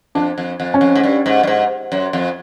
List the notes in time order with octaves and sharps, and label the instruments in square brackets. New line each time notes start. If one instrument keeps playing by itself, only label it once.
[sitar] F2 [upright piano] D4
[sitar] F2
F2
[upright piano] C#4
[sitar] F2
G#2
G2
G#2
G2
G#2
F#2
F2